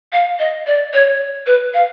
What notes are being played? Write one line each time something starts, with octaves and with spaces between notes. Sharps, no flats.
F5
D#5
D5
C#5
B4
F5